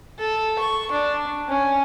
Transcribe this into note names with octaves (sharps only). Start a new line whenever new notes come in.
A4
C#6
D4
C#4